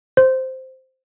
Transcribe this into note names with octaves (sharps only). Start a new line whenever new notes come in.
C5